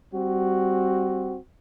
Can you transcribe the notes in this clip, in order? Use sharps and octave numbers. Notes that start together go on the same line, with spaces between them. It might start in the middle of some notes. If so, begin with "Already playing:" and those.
G3 C4 F#4